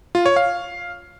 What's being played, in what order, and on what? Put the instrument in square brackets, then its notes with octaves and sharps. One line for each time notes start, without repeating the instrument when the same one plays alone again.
[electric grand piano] F4
C#5
F5